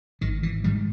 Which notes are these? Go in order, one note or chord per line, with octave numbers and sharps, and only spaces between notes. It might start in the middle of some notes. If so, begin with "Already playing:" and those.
G#1 D#3
E3
G#2 D#3 G3